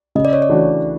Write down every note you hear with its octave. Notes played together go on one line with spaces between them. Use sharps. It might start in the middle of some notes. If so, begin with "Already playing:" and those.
C#3 D#5
D5
C#5
D5
E3 A3 D4 F#4